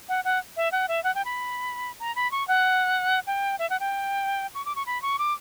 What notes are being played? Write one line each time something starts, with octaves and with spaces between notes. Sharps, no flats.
F#5
F#5
E5
F#5
E5
F#5
G5
B5
A#5
B5
C#6
F#5
G5
E5
F#5
G5
C#6
D6
C#6
B5
C#6
D6